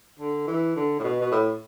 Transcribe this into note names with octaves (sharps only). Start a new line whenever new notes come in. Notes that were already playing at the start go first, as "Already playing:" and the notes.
D3
E3
D3
A2
B2
B2
A2